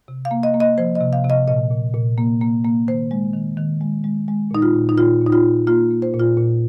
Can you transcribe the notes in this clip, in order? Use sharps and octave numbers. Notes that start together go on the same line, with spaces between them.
C3
F5
A#3
D#5
A#3
D#5
F3 C5
D#5
C3
F5
C3
D#5
A#2 D#5
A#2
A#2
A#3
A#3
A#3
D#3 C5
G#3
D#3
D#3
G#3
G#3
G#3
A#2 D#4
F4
A#2
D#4
A#2 F4
A#2
D#4
F4
A#2
A#3 F4
A#3
C5
A#2
F4
A#2